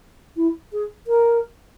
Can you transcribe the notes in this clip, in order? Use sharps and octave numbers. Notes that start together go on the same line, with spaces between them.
E4
G#4
A#4